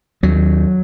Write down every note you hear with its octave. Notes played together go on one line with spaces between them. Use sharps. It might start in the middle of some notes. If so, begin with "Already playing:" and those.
D#2 F#3